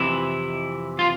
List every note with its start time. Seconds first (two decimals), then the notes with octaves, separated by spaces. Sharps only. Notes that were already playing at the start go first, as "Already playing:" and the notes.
Already playing: F2 C3 E3 E4
0.99 F4